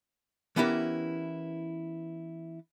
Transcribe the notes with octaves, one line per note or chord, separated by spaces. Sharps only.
E3 B3 C#4 E4 G4 A#4